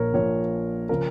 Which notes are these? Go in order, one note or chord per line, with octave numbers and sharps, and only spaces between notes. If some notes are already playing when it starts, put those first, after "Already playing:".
Already playing: A#1 A#2 F3 A#4 C#5
A#1 A#2 F3 C#5
C#3 F3 A#4